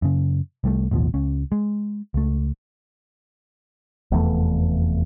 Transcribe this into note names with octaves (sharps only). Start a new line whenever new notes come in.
F#2 C#3
C2 G3 A3
A1 D#2 B2 F3
C#2 C#4
G#3
C#2 A3
F1 E2 E3 A3